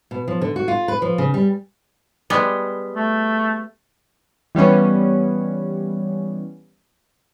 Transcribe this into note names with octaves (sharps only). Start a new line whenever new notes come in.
B2
F3
D3
F#4
F4
B4
F3
C#3
G3
G3 G#3 B3
A3
E3 G3 B3 C#4